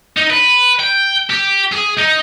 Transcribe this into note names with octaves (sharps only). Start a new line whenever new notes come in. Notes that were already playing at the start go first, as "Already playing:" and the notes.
D#4
B4
G5
G4
G#4
D#4